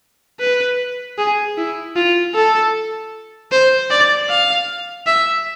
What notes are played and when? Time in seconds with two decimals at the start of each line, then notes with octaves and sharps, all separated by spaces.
0.40 B4
1.18 G#4
1.58 E4
1.96 F4
2.34 A4
3.52 C5
3.90 D5
4.30 F5
5.07 E5